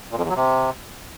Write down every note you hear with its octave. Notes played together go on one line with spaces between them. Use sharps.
A#2
F2
E2
F#3
C3